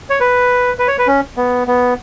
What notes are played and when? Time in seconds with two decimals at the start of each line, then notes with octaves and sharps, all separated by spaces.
0.10 C#5
0.20 B4
0.79 B4
0.88 C#5
0.98 B4
1.07 C#4
1.37 B3
1.67 B3